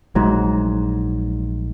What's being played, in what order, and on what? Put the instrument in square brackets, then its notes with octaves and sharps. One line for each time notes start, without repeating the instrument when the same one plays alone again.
[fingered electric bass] A#1 G#3 A3 [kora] G#2 F#3